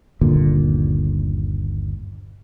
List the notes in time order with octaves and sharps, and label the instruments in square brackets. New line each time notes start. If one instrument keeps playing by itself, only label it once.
[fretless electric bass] G1 D#2 A#2 D3